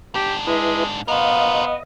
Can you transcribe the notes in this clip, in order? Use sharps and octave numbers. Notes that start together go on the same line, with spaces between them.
G#2 D4 G4
G#3 E4 B4
B3 A#4 C5 D#5 F5